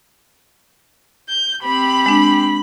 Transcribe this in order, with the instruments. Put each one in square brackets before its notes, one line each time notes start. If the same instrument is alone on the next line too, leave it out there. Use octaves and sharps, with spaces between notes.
[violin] G6
[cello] C4 G4 [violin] B5
[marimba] G#3 D4